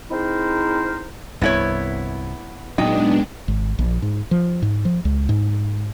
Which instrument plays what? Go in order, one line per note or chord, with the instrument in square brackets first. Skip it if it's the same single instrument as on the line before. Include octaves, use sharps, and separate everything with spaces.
[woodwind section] C4 D#4 E4 G#4 A#4 C5
[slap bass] C2 G2 C3 [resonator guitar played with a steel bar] B3 E4 C#5
[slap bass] A#2 F#3 [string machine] G#3 B3 D4 [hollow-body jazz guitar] D#4 [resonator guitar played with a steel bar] G5
[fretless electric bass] G#1
A#1
G#2
F3
G#2
F3
C#2
G#2